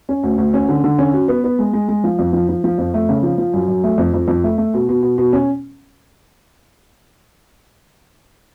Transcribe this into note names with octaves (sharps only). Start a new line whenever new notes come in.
C#4
D2
D2
C#4
D3
D3
C#4
F#4
B3
B3
G#3
G#3
G#3
F3
F2
F3
F3
F3
F2
A3
C#3
F3
F3
F#2
F#2
A3
F2
F2
F2
A3
A3
B2
B2
B2
B2
C#4